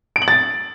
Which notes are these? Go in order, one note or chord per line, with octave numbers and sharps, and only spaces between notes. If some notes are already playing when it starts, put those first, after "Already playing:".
D7
F#7
A6